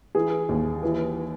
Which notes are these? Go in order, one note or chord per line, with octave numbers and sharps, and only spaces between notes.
E3 G#4
D#2
E3